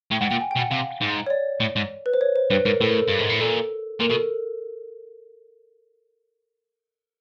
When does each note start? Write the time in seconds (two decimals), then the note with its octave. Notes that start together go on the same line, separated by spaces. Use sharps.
0.11 A2 G5
0.21 G#2 F#5
0.30 A#2 G5
0.41 G#5
0.51 G5
0.56 B2
0.60 F#5
0.71 C3 F5
1.01 G#2
1.26 C#5
1.30 D5
1.60 A2
1.76 G#2
2.06 B4
2.14 C5
2.21 C#5
2.36 C5
2.51 G2 B4
2.65 G#2 A#4
2.81 A2 A4
2.89 A#4
2.98 A4
3.08 G2
3.19 G#2
3.29 A2
3.40 A#2 A4
4.00 A#2 A#4
4.10 B2 A4